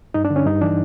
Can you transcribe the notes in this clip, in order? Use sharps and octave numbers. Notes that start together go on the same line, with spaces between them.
G2 D#4
D4
D3
C#4
G2 D#4
E3 D4